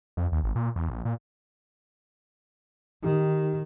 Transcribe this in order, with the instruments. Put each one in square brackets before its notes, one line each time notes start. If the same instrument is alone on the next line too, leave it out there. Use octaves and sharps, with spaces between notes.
[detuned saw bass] F2
D#2
G#1
A#2
E2
A#1
A#2
[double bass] D#3 [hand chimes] D#4 G4